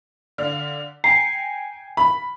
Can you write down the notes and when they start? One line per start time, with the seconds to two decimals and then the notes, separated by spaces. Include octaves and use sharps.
0.38 D3 D4 F5
1.04 G5 G#5 A#5 C7 C#7
1.97 B5